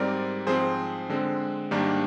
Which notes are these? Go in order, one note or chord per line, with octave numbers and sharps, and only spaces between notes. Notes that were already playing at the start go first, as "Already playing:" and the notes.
Already playing: G#2 G3 C4 A#4 D5
G#2 F3 C4 G#4 C5
D3 G#3 C4
G#2 D#3 G3 A#3 D4